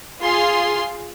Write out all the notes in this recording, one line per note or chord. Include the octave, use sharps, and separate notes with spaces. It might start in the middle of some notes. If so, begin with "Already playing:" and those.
F4 G#4 F5 C6